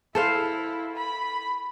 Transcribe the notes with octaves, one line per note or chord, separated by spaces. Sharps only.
E4 A4 C5 F5
B5